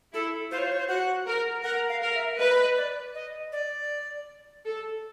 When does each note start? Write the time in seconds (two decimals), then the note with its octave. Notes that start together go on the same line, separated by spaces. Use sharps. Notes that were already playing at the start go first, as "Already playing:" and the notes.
0.13 E4 A4
0.51 F4 C5
0.58 C#5
0.66 C5
0.72 C#5
0.80 C5
0.88 F#4 F#5
1.27 A#4
1.64 A#4 F#5
1.89 F5
2.02 A#4
2.15 E5
2.39 B4 D#5
2.77 D5
3.15 D#5
3.52 D5
4.66 A4